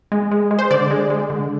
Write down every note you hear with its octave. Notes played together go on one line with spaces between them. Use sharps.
G#3
G#3
G#3
C5
D3 D5
G#3
G#3
D3